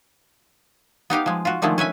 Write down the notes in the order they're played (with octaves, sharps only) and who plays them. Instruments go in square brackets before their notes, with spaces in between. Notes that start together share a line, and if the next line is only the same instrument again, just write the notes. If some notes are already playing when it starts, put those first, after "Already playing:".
[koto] B3 D#4 G4 F5
F3 G#3
F4 F#4
D3 D#3 F3 G#3 A3
C#4 B4 E5 G#5